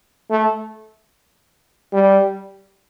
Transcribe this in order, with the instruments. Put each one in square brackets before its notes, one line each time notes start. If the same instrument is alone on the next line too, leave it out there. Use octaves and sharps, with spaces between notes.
[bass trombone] A3
G3